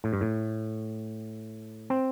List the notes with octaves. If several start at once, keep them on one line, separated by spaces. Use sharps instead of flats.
A2
G2
A2
C4